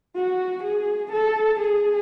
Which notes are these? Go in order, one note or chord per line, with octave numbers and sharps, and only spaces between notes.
F#4
G#4
A4
G#4